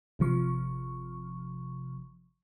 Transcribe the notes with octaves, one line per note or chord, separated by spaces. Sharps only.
G#1 C3 F3 C#6